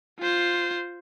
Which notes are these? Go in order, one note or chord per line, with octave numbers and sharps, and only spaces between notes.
F4 C5